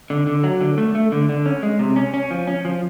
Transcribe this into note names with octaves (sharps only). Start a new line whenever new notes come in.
D3
D3
F#3
D3
A3
A3
D3
D3
C#4
G#3
C3
C#4
C#4
F3
C#4
F3